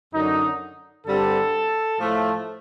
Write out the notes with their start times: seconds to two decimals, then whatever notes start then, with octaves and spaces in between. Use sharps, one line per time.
0.12 F#2 D3 F#3 D#4
1.06 G2 D3 G3 C4 A4
2.00 A2 F3 A3